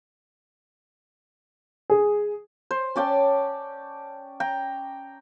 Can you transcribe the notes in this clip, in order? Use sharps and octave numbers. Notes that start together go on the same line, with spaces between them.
G#4
C5
C#4 D5 G5 A5
G5 A#5